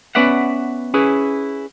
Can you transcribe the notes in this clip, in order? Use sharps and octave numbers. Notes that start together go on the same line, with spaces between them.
B3 C#4 B4 D5 E5 F#5
C#4 E4 G#4 B4